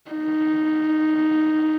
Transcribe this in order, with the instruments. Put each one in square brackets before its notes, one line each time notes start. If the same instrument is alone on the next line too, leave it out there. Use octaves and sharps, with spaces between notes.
[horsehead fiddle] D#4